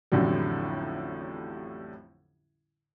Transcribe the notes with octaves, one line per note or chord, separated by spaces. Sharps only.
A1 F2 A2 D3 F#3 G3